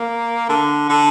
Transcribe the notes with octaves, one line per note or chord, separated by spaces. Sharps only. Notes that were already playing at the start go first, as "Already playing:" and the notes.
Already playing: A#3
D3
D3